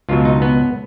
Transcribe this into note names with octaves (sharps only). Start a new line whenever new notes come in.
C#2 B2 F#3 F4
D#4
B3